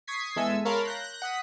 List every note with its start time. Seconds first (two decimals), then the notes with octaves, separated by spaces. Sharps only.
0.07 C#6 D#6 G#6 B6 C7
0.36 E2 G#3 A4 E5 G#5 E6
0.65 A#4 C#5 F5 A5 B5 C6
0.85 F#6 G6 A#6
1.22 F#5 D#6 B6